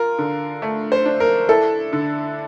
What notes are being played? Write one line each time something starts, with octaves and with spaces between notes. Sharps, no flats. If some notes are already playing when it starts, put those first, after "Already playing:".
Already playing: F4 A#4
D3
A3
C5
D4
A#4
E4 A4
D3